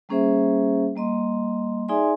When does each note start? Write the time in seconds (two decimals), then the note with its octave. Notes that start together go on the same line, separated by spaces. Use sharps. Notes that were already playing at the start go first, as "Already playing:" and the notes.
0.09 G3 A#3 C#4 G#4 C5 E5
0.96 G3 A#3 D#5 C6
1.89 D#4 G#4 D5 E5 G#5 C6